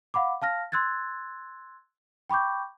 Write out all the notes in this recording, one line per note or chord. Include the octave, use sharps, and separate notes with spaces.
F5 F#5 B5 D6
F5 A5 F6 A#6
C6 E6 F#6 G#6 A6
G5 B5 C#6 D6 G6